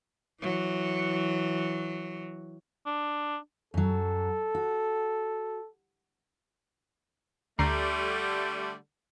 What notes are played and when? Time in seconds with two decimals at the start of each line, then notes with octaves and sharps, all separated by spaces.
0.41 E3 F#3
2.86 D4
3.74 F#2 F#3 A4
4.55 F#4
7.59 D2 D3 G3 A3 A#5 C7